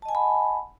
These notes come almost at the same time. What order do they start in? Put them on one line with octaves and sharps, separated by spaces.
A5 D#5 G#5 F#5 B5